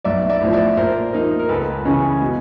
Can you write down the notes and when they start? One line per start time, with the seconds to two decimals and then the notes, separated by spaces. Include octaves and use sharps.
0.05 B1 D5 E5
0.29 D5 E5
0.41 A2 F3
0.53 D5 E5
0.77 A#2 A#4 C5
1.13 F3 A#3 D#4
1.39 A#4
1.49 C#2 A4 B4
1.85 C#3 E3 G#3 C#4
2.22 B2